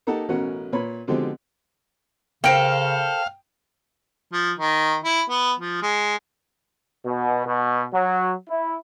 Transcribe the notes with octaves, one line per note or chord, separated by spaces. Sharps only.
A#3 D#4 G4 A4 F#5 A5
A1 B2 C#4 F#4 A#4 F#5
A#2 B4 C#5 B5
B2 D3 F3 G#3 C4 G4
C#3 A4 A#4 C5 F5 G5
F3
D#3
E4
B3
F3
G#3
B2
B2
F#3
E4